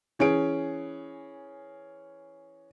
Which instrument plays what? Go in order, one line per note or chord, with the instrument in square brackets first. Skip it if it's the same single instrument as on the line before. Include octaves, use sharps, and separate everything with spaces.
[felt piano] E3 C#4 G#4 D7